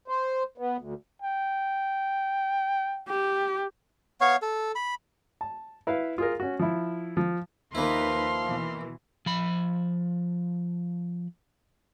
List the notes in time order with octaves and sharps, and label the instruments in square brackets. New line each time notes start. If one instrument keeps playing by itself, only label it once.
[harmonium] C5
B3
D2
[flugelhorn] G5
[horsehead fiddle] G4
[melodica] B3 C#5 F5 C#6
A4
B5
[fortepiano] A5
E4 B4 F5
F4 G#4 A#4
C#4 F#4
F3 E4
F3
[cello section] D#2 D#4 B4 [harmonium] F3 [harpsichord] A#3 E4 [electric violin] C6 F6
[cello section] B2 E3
[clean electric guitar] F3 B5